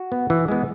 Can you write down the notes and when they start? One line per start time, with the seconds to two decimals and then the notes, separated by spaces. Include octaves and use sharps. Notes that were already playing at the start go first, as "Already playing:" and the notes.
Already playing: F#4
0.12 B3
0.30 E3
0.48 G#3 B3